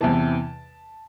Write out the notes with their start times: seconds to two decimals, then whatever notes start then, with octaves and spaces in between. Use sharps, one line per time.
0.01 E2 C3 E3 A5